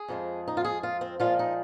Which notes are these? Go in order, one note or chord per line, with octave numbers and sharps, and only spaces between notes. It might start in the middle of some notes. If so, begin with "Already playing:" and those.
Already playing: G#4
F2 F3 G#3
D#4
F4
G#4
F4
C4
A#2 F3 G#3 F4
D#4